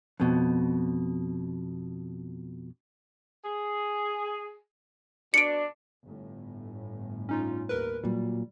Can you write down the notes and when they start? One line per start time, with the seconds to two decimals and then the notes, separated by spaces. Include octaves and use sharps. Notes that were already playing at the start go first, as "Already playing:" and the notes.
0.20 F2 B2
3.44 G#4
5.34 B2 D4 C#7 D7
6.05 G1 A2
7.29 C#4 D#4 F4
7.69 D#2 A#4 B4
8.03 A#2 F#3 G3